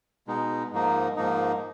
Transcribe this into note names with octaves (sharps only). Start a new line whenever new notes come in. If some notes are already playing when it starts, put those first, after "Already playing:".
B2 G#3 D#4
G#2 F3 A#3 D#4
G#2 F3 A#3 D#4